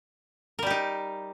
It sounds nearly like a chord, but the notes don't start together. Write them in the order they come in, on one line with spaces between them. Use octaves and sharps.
A#4 G3 G4 D#4